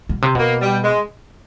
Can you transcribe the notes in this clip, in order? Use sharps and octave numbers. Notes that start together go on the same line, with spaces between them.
B2
C3
B2 A#3
G3
G#3